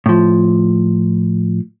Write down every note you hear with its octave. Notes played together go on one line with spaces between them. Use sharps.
A2 F3